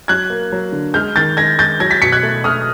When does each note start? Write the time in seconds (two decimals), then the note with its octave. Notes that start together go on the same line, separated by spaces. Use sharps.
0.08 F#3 F#6 G#6
0.30 A#3
0.52 F#3
0.73 D3
0.94 G#3 F6 G6
1.16 D#3 G6 A6
1.37 G#3 G#6 A#6
1.59 G#3 G6 A6
1.80 F#3 G#6 A#6
1.91 A6 B6
2.02 B2 B6 C#7
2.12 F#6 G#6
2.23 A3
2.44 A3 D#6 F6